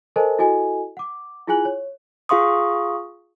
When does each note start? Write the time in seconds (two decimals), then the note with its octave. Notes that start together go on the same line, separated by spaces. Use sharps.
0.16 A4 A#4 C5 D#5 G#5 A5
0.39 E4 F#4 A4 D#5 G#5
0.97 F#5 D6
1.48 E4 F4 G#4 G#5 F#6 F#7
1.65 C#5
2.29 F4 G#4 F5 C6 C#6 D#6